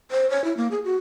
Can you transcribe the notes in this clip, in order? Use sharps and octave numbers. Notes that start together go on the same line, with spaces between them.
C5
C#5
E4
A#3
G#4
F#4